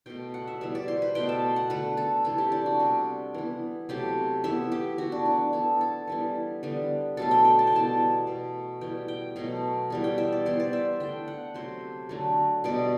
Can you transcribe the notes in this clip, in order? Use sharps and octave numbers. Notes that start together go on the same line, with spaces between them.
B2 A3 G5
F#5
E5
E3 G3 B3 E5
D5
C5
B4
B2 A3 G5
A5
F#5
D3 A3 B4
A4
C3 E3 A3 A4
G4
D4
F#4
C3 G3 B3
E3 B3
C3 F#3 A3 G4
E3 B3 E5
G4
E3 A3 F#4
D4
D4
E3 B3 A4
A4
E3 G3 B3
D3 G3 B3
B2 F#3 A3 A4
G5
G5
A5
G5
E3 G3 B3 A5
B2 A3
E3 G3 B3 G5
G5
B2 F#3 A3
E3 G3 B3
G5
E5
D5
E3 B3 C5
D5
E5
D3 A3 G5
F#5
C3 F#3 A3 C5
D3 F#3 A3
B2 G3 B3 D5